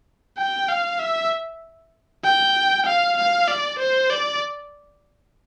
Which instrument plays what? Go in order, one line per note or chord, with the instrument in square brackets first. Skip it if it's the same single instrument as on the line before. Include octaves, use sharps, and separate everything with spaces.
[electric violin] G5
F5
E5
G5
F5
F5
D5
C5
D5